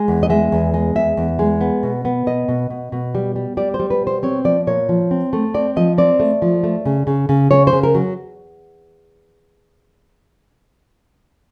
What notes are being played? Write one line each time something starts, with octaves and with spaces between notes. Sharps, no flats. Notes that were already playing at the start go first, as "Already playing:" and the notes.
Already playing: G#3
E2
D#5
G#3 E5
E2
G#3
E2 E5
E2
G#3
B3
B2
B3
B2 D#5
B2
B2
B2
G3
G3
G3 D5
C5
G3
B4
B2
C5
C4 C#5
F3 D5
A#2 C#5
F3
C4
A3
C4 D5
F3 D#5
C4 D5
A3
F3
A3
C#3
C#3
C#3
C#3 C#5
C5
C#3
A#4
F#3